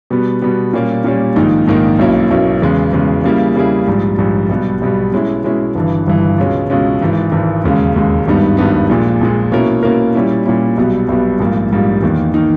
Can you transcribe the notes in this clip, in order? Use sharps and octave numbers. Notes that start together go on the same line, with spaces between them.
B2 G3 B3
B2 G3 B3
A#2 G3 A#3 C#4
A#2 G3 A#3 C#4
A#1 G#2 D#3 A#3 D#4
A#1 G#2 D#3 A#3 D#4
B1 B2 A#3 C#4 E4
B1 B2 A#3 C#4 E4
E2 C#3 G#3
E2 C#3 G#3
C#3 G3 A#3 E4 G#4
C#3 G3 A#3 E4 G#4
A#1 G#2 G3
A#1 G#2 G3
B1 B2 G3 B3
B1 B2 G3 B3
B2 G#3 C#4 E4
B2 G#3 C#4 E4
G1 G2 E3
G1 G2 E3
C#2 B2 G#3 C#4
C#2 B2 G#3 C#4
G#1 G#2 E3
G#1 G#2 E3
E1 D#2 C#3 G#3
E1 D#2 C#3 G#3
G#1 G2 G3 B3 D#4
G#1 G2 G3 B3 D#4
A#1 A#2 G#3
A#1 A#2 G#3
B2 A#3 C#4 E4 A#4
B2 A#3 C#4 E4 A#4
A#2 G3 C#4 E4
A#2 G3 C#4 E4
B1 B2 G3 B3
B1 B2 G3 B3
A#1 G#2 G3 A#3
A#1 G#2 G3 A#3
E2 D#3 A#3 D#4
D#3 A#3 D#4